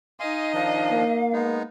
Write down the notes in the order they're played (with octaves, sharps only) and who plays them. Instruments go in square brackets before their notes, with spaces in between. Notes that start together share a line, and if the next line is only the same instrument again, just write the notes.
[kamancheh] D#4 D#5 [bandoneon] F5 G#5 C6
[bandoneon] D#3 F3 D4 [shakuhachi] F5
[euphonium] A#3
[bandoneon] G#3 B3 D#4